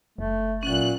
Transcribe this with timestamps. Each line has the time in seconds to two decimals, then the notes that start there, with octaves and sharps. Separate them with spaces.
0.18 F#1 A3
0.63 A#2 F#3 C#4 F#6